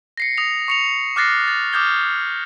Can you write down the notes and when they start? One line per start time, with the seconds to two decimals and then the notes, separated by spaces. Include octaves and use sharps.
0.17 A#6 C7 C#7
0.37 D#6 A#6 F7
0.68 C#6 C#7 F7
1.16 D6 F6 F#6 A6 A#6 C7
1.48 A6
1.73 D6 D#6 F6 G6 G#6 G7